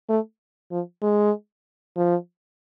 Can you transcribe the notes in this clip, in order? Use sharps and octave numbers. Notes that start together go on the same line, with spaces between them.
A3
F3
G#3
F3